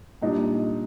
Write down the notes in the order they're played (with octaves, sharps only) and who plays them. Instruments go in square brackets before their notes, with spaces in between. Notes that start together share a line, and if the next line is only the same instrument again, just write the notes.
[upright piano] A#2 G3 D4 [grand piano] D#4